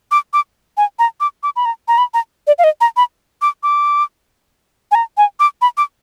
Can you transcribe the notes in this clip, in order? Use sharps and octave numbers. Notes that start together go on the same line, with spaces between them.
D6
D6
G#5
A#5
D6
D6
B5
A#5
A#5
B5
A#5
D5
F5
D#5
A#5
B5
D6
D6
G#5
A#5
G#5
D6
B5
D6